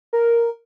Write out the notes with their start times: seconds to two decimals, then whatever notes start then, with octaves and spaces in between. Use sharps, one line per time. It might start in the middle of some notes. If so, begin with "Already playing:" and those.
0.13 A#4